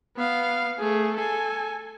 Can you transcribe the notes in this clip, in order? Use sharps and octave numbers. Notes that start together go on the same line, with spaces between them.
B3 F5
A3 G#4
A4 G#5